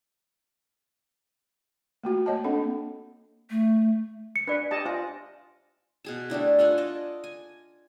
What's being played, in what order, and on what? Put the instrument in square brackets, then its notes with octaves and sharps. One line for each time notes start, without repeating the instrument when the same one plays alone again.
[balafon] A3 A#3 F#4
A#3 C#5 D#5 A5
A#3 C4 D4 A4 F#5
[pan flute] A3
[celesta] C#7
[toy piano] D4 D5 [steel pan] B4
[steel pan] G4 D#5 A5
[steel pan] F4 [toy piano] C5 E5 G#5
[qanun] B2 G#4 A5
G3 A3 D4 E4
F4 A4 F#5 G#5
D5 D#5 A5
G#5